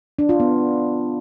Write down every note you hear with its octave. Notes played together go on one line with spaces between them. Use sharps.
D4
F4
B3